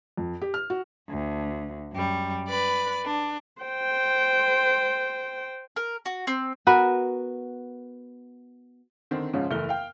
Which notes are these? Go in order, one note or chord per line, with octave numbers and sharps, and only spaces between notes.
F2
G4
F6
F#4
D2
F#2 G3
B4 D5 B5
D4
C5 G5
A#4
F#4
C4
B3 F#4 A#4 B4
D3 D#3 C4
G#2 C#3 F3 G#3 C#4
F#1 E2 A3 F6 G7
F5 G5